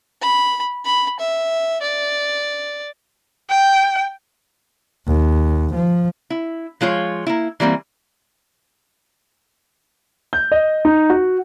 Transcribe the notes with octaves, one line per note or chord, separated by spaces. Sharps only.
B5
B5
E5
D5
G5
D#2
F3
E4
F3 G#3 F4 C#5
A#3 E4
E3 G3 A#3 C4
G6
D#5
D#4
F#4